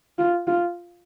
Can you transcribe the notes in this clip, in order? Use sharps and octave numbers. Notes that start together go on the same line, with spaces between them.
F4
F4